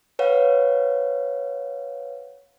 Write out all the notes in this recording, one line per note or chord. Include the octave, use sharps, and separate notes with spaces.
B4 C#5 F5 F#5